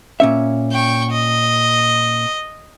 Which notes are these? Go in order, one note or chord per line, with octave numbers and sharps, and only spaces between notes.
A#2 C#4 E5
G5 C#6
D#5